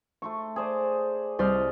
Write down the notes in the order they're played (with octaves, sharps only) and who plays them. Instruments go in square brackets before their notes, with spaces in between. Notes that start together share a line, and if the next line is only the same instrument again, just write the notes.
[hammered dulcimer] A3 C6 C#6
G#4 C5 D5
[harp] C2 C5 F6 [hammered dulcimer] D5 D#5